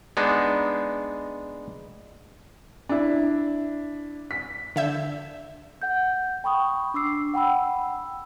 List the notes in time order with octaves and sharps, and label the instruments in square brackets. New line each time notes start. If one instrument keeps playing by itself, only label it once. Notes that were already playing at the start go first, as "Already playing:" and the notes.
[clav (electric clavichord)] G#3 B3 D4 D#4
[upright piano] D4 E4
B6
[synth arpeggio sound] D3 E5 G6
[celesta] F#5 G6
G5 B5 C#6 D#6
D4 D6 E6 C7
F#5 G5 B5 E6